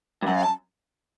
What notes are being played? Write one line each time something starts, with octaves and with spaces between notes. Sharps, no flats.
G2
F#2 F#5
F5
A5